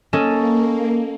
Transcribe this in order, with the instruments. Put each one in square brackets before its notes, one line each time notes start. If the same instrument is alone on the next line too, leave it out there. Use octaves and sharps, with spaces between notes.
[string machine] A#3 [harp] C#4 A4 D#5